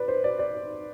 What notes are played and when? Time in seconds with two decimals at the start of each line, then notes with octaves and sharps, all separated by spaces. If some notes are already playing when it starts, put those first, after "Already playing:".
Already playing: B4 D5
0.08 C5
0.24 D5
0.39 D5